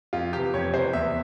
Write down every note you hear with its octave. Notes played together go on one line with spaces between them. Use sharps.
F2 F4
C3 E3 G4
F2 C#5
C3 E3 C5
E2 E5